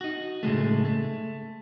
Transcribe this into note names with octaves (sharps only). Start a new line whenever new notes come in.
D#4 F#4
A2 C#3 G#3 A3
A3